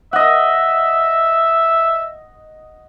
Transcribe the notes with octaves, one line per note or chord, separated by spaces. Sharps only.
D#5 E5 F#5